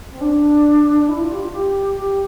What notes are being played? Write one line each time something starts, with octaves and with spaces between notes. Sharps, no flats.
C4
D4
E4
F4
G4
F4
G4
G4